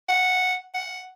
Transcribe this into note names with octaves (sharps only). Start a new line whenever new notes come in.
F#5
F#5